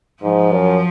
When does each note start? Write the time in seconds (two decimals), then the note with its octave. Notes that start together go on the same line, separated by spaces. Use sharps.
0.22 G#2 F3
0.52 F#2